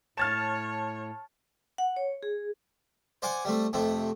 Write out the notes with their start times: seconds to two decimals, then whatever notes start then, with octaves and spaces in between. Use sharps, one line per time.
0.17 A2 C#5 A5 F6 A6 E7
1.78 F#5
1.97 C#5
2.23 G#4
3.22 C5 D5 F#5 G#5
3.45 G3 A3 C4
3.73 F2 C3 A3 C4